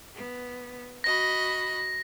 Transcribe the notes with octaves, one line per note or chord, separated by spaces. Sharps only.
B3
F#4 D#5 B5 A#6